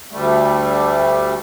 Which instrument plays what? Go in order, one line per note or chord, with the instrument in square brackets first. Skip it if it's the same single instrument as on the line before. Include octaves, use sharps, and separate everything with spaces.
[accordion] D2 G3 A3